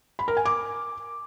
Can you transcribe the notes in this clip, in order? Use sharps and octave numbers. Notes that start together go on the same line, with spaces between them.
B5
A#4
G#5
D6